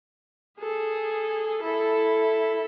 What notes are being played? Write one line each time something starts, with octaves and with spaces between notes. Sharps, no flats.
G#4 A4
E4 A4